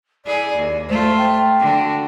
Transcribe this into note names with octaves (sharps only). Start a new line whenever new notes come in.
E4 G#4 D5
D#2
A3 F4 C5
G5
D3 F#4